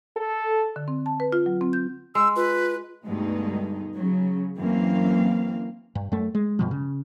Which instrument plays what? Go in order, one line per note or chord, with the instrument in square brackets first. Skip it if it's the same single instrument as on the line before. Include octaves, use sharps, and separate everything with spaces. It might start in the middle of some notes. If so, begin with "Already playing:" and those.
[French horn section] A4
[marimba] D3
C4
A5
B4
F4
F#3
C4
G6
[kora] G#3 [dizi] E6
[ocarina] F4 [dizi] B4
[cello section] D2 G2 B2 G#3 D#4
C#3 F#3
F#2 E3 A#3 C4 F5
[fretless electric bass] G2
F#2 A3
G#3
G2 B2 F3
C#3